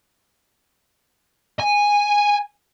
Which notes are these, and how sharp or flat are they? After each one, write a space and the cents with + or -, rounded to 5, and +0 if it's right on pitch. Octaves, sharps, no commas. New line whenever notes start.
G#5 -10